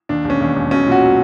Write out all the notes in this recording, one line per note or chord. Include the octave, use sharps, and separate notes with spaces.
D#2 D4
E1
C#4
D#2
E1
B1 C#4
A#2 F#4
F#3